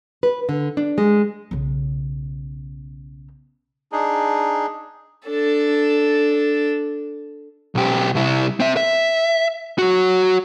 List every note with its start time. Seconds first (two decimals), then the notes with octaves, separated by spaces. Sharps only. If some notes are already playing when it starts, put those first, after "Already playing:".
0.23 B4
0.49 D3
0.77 D4
0.98 G#3
1.51 B1 C#3
3.92 D4 D#4 G#4
5.27 D4 A4
7.75 B1 G4
8.15 C2 E4
8.60 C4 E5
8.77 E5
9.78 F#4 C#5